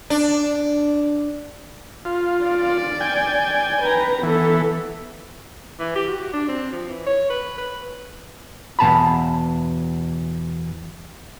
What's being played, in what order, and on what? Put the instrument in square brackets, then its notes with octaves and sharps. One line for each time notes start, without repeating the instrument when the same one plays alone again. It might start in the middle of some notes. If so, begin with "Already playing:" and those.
[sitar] D4
[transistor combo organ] F4
[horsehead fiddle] D5
[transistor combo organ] G5 G#5
[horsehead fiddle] B4 A#5
[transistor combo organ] E3 [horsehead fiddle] B3 A4
[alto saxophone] E3
G4
F#4
D4
C4
F3
E3
C#5
B4
B4
[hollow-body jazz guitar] E2 B2 A5 B5